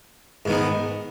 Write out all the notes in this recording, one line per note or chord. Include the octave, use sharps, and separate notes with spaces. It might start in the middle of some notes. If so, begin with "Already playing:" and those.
G#2 D#3 B3